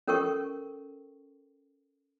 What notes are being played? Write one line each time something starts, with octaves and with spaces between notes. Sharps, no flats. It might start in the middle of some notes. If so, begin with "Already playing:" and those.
C#4 A4 A#4 G5 C#6